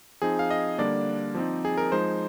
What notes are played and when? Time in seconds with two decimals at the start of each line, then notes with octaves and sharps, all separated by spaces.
0.22 F3 C4 D#4 G#4
0.39 F5
0.51 D#5
0.78 D3 G3 A#3 D4 D5
1.35 F3 C4 D#4
1.65 G#4
1.78 A#4
1.92 F3 G#3 D#4 C5